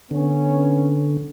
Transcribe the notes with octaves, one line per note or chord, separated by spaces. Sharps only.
D3 B3 C#4